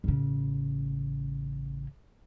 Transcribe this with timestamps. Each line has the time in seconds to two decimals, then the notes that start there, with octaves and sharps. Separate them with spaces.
0.04 A1 C#3